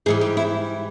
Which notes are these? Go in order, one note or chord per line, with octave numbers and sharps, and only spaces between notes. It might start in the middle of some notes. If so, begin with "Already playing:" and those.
G#2 E3 G3 G#4
G4
E4